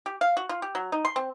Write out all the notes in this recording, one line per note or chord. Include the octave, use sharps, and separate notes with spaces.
G4
F5
F#4
F4
G4
F#3
D#4
C6
C4